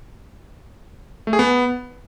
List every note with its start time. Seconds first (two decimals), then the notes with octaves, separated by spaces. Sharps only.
1.27 A3
1.33 G#4
1.39 B3